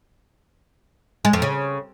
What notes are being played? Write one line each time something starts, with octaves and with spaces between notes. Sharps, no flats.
G#3
F2
C#3